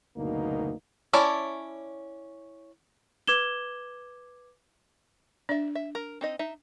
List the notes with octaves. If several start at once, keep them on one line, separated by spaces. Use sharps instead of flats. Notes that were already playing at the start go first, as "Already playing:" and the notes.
F#1 D2 B2 A#3 D#4
C#4 E4 C#5 D5 A5
B4 D6 G#6 E7 G7
D4 D5 E5
E5
A#4
C4 D#4 D#5
D#4 E5